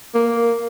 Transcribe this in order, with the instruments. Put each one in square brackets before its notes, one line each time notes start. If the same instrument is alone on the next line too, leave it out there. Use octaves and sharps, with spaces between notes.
[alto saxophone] A#3